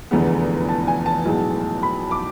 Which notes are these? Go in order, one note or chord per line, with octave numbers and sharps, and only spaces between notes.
F1 E2 D3 G#3 B3
A5
G#5
A5
B1 A2 G#3 B3
B5
D6